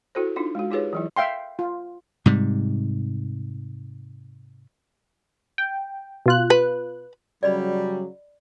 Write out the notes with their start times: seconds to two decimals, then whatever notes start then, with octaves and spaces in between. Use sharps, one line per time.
0.15 E4 F#4 A4 C5
0.36 D4 D#4 F4
0.55 G#3 F#4
0.71 D#4 F4 G4 G#4 B4 C#5
0.93 E3 F#3 E4
1.16 E5 F5 G5 C6
1.59 F4
2.26 G#2 C3 G3
5.58 G5
6.26 B2 F4 F#6
6.50 B4
7.43 C#3 F#3 G3 D5 D#5 B5